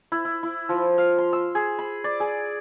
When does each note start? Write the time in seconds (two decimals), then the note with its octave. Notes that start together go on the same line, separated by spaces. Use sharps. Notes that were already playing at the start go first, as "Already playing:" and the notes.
0.12 E4
0.25 E4
0.43 E4
0.69 F3
0.98 F5
1.18 C6
1.33 E6
1.55 G#4
1.79 B5
2.04 D5
2.20 G#4